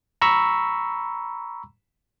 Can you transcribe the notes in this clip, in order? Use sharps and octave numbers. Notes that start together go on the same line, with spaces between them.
A#5 B5 C#6 E6